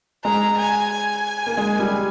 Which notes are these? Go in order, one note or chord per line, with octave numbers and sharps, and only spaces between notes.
G#3 A#5
G#5
G#5
A#3
G#3
G3